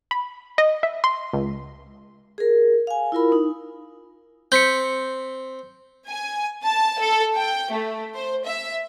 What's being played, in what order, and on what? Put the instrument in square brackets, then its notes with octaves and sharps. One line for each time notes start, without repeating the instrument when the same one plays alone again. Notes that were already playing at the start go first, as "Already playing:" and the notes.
[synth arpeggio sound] B5
D#5
E5
C6
C#2
[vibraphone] G#4 A#4
F5 G#5
E4 F4 A#4 B5
D#4
[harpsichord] C4 [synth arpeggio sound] G6 B6 C#7
[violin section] G#5
A5
A4
G5
A3
C5
E5